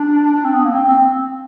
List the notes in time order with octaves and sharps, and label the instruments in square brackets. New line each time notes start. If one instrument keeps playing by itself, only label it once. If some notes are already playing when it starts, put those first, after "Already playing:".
Already playing: [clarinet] D4
D4
C4
B3
A#3
C4
C4